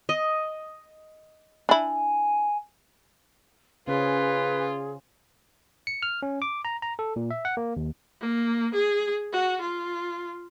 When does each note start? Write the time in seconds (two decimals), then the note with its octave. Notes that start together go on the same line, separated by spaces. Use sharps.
0.09 D#5
1.69 D4 E4 G#5
3.87 C#3 C#4 F4 G#4 B4 C5
5.87 C#7
6.03 F6
6.22 C#4
6.42 D6
6.65 A#5
6.82 A#5
6.99 A4
7.16 A#2
7.31 E5
7.45 F#5
7.57 A#3
7.77 D#2
8.21 A#3
8.74 G#4
9.32 F#4
9.61 F4